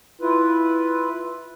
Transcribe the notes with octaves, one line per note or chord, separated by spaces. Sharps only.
E4 F4 B4